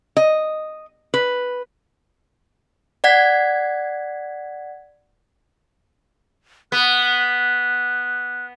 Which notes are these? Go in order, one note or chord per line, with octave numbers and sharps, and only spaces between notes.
D#5
B4
D5 F#5 G#6 B6
B3 F#6